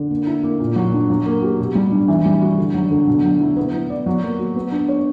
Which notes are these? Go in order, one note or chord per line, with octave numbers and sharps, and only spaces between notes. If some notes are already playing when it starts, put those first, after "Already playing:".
Already playing: D3
A#3
E4
A#3
A#2
F#3
D4
F#3
A#3
G4
B2
G3
D4
E3
G3
F#4
D3
F#3
D3
B2
F#3
E4
B3
E4
D5
F#3
A#3
F#4
B3
D4
C#5